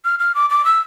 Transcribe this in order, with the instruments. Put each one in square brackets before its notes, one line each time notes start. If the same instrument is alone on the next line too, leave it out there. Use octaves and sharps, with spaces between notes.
[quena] F6
F6
D6
D6
E6